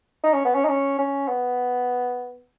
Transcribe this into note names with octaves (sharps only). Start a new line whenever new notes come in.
D#4
C#4
B3
C#4
D#4
C#4
C#4
B3